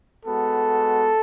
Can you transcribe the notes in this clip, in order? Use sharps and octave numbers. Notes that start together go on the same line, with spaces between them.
G#3 B3 F#4 A4